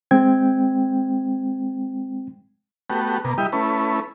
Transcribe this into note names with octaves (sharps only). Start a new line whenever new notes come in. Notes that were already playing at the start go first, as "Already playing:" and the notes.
G#3 C4 G5 G#6
A3 B3 F#4 G4
B2 A#3
G3 E4 G4 D#5
A3 C#4 E4 B4